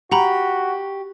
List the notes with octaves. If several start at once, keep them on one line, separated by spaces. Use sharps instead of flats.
F#4 G4 F#5 A#5 B5